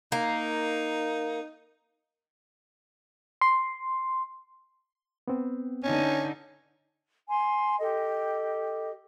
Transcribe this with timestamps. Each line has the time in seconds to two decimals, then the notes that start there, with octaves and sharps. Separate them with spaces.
0.12 A#3 D#4
3.41 C6
5.28 B3 C4
5.84 D3 C#4 D#4
7.29 G#5 C6
7.79 G4 A4 D#5